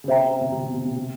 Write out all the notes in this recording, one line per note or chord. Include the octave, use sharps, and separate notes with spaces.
C#3
C3 C5 E5 G5 A#5
C3
C3
B2
C3
C3
C3